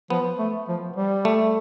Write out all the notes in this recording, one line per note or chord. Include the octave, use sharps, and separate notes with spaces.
F3 B3
A3
F3
G3
A3